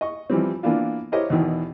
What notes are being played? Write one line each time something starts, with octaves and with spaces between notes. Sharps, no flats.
D#5 C#6
E3 F3 G3 C4
E3 A#3 B3 D4 F4
E4 G4 A#4 C5 C#5 D#5
E2 B2 D#3 E3